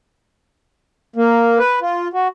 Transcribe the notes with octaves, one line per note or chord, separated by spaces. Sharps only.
A#3
B4
F4
F#4